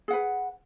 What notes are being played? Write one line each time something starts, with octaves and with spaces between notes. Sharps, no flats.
G#4 B4 F#5